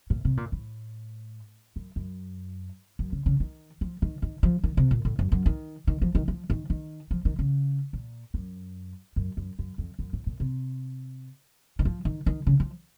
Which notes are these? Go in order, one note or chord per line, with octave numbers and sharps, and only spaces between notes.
A#2
C3
A#2
A2
F#2
F#2
F#2
C#3
C#3
D#3
F3
D#3
D#3
F3
D#3
C3
A#2
A2
F#2
F#2
D#3
D#3
F3
D#3
F3
D#3
D#3
F3
D#3
C#3
A#2
F#2
F#2
F#2
F#2
F2
F#2
A2
A#2
C3
D#3
F3
D#3
D#3
C#3
F3